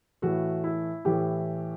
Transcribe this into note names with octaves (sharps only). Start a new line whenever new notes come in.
A2 E3 A3 F#4
E4
A2 E3 A3 G4